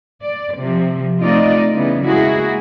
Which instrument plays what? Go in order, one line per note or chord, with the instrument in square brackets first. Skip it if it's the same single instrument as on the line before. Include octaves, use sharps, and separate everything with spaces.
[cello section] D5
C3 F3
A3 C4 D#4 F4 D5 D#5
C#3 E3 B3
G#3 A#3 E4 F#4 G#4